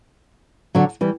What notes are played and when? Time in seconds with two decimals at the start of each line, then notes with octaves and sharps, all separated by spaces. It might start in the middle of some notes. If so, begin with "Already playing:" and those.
0.75 D3 F#3
1.01 E3 G3